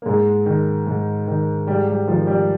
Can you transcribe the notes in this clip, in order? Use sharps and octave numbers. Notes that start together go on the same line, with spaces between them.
A#3
G#2 G#3
D#3
G#2
D#3
G#2 G3
G3
D#3 F3
G3